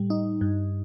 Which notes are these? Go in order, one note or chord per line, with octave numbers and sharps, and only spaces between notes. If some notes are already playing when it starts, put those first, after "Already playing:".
Already playing: A2 G3
D#4
G2